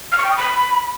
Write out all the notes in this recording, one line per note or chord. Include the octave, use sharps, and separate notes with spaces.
F6
C#6
G5
D#6
B5